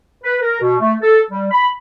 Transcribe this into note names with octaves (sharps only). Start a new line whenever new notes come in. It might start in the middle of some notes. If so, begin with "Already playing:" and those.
B4
A#4
B2
A3
A4
G3
B5